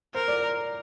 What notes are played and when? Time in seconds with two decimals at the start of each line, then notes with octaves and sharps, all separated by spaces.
0.14 A#4 C5
0.28 D5